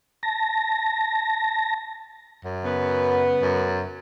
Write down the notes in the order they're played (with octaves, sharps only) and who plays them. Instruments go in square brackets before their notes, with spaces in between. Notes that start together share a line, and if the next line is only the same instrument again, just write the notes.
[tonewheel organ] A5 A#6
[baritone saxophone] F#2
[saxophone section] C#3 F#3 B3
[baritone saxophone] F#2